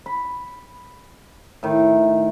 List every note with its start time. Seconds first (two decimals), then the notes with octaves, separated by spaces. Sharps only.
0.06 B5
1.63 A2 D#3